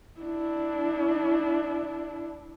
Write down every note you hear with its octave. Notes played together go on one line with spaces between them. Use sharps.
D4 E4